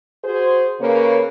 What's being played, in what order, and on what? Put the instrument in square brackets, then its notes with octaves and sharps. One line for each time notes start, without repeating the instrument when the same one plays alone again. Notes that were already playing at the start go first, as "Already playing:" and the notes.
[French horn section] F#4 G#4 C5
C#3 A#3 B4 C#5